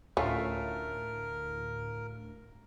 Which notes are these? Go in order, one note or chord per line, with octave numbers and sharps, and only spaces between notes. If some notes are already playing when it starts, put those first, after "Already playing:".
D2 A2 A3 C#4 F4 A#4 E5